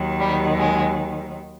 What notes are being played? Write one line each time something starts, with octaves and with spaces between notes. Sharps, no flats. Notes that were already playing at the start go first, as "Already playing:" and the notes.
Already playing: D#2 D#3 F#3
G3
G#3